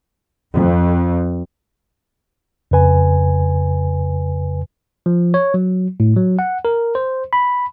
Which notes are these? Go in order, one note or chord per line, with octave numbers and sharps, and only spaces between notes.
F2
F2 C#3 B4 G#5
F3
C#5
F#3
A2
F#3
F#5
A#4
C5
B5